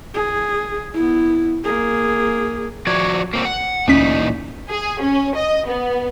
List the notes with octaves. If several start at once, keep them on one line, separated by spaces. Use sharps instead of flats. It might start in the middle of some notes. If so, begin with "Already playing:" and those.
G#4
B3 E4
A#3 G#4
F3 F#4 D5 G#6
A#3 C4 F#4
F#5
D2 A#2 E3 C#4 D#4 B6
G#4
C#4
D#5
B3